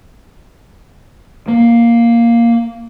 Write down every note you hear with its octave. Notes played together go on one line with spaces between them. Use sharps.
A#3